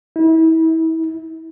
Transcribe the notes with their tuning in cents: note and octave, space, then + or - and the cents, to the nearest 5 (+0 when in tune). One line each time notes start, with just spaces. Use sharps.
E4 -35